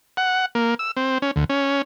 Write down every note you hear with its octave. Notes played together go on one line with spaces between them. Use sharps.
F#5
A#3
E6
C4
C#4
D2
C#4